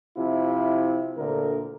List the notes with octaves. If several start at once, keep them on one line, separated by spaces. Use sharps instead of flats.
C3 F3 E4 F4
D2 A#2 D3 A#4